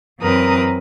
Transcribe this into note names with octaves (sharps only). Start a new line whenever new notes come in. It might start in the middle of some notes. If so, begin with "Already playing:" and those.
F#2 E3 C4 A#4 B4 D#6